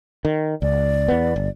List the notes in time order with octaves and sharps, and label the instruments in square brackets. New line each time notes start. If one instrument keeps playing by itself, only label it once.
[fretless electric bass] D#3
[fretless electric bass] C#2 [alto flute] D5
[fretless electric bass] E2 B3
G1